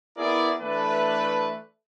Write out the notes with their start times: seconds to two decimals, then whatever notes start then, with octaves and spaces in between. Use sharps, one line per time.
0.17 B3 E4 G#4 A#4 D5
0.61 E3 A3 D4 A4 B4